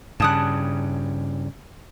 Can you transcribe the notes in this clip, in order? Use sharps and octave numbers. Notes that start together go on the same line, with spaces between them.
G2 C#3 A5 D#6 F#6